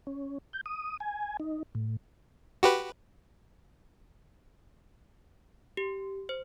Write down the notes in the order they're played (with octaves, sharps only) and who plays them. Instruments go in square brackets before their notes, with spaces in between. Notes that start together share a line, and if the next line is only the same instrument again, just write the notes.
[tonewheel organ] C#4
G6
D#6
G#5
D#4
A2
[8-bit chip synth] F#4 G4 B4
[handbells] G4
C5